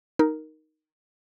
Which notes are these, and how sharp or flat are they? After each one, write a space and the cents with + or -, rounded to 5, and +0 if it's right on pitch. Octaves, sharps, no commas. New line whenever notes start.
D#4 +0 A#4 +0